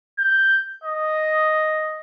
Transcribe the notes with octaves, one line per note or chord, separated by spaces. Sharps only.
G6
D#5